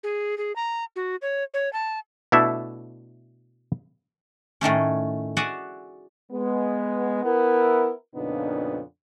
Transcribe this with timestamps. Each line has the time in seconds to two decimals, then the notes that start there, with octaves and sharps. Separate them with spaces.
0.04 G#4
0.38 G#4
0.56 A#5
0.96 F#4
1.22 C#5
1.54 C#5
1.73 A5
2.32 B2 A3 D4 E4 A4 E5
4.61 A2 D#3 A3 C#4
5.37 F#4 G#4 D5 E5 F#5 G#5
6.32 G#3 B3
7.24 B3 E4 A#4
8.16 F2 A#2 C#3 B3 D4 D#4